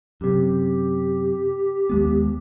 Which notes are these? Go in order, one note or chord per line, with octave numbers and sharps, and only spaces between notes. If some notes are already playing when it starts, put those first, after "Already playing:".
F#2 C3 G4
D#2 G#3 B3